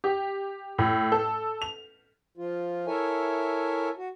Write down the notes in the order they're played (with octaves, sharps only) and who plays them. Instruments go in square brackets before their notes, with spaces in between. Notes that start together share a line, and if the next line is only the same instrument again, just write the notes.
[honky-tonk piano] G4
A2
A4
F7
[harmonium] F3 F4
E4 A4 A#4 C#5 E5 G#5
F#4